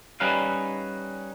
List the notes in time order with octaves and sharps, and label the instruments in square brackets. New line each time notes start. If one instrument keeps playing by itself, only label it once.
[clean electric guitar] G3 C#4 D#4 B4 F5